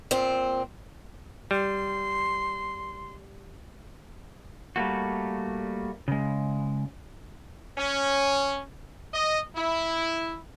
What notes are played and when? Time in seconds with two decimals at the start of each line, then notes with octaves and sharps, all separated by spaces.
0.11 A#2 C4
1.51 G3 C6
4.76 G3 A3 A#3 F#4
6.08 C#3 G#3
7.77 C#4
9.12 D#5
9.55 E4